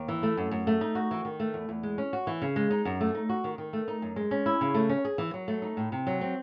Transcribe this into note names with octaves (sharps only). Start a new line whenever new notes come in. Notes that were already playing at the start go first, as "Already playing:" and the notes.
Already playing: D#2
E3
A3
F#2
F#2
A3
D#4
F#4
E3
D#3
A3
E2
E2
G#3
C#4
F#4
E3
C#3
G#3
D#4
F#2
A3
D#4
F#4
D#3
D#3
A3
D#4
F#2
G#3
C#4
E4
C#3
A3
C#4
G#4
E3
F#3
A3
D#4
A2
C3
F#3
C4